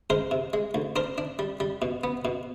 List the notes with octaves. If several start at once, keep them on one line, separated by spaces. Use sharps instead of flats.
G#3 A#4 C5
C3
G#3
D2
D4 A#4 C5
D4
G3
G3
B2
B3
B2